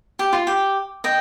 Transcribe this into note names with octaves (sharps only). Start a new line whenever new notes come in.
G4
F4
G4
D#5 G5